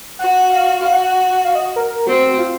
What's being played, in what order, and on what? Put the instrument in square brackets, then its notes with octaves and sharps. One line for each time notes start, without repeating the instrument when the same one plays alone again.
[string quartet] F#4 [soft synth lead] F#5
[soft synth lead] F5
[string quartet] F#4 [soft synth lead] F5
[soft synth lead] F#5
F#5
F5
D#5
A#4
[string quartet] C4 [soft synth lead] F#4
[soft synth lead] F4